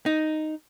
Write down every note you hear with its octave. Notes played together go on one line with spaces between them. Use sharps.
D#4